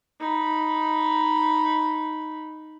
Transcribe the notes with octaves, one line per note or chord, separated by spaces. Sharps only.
D#4 B5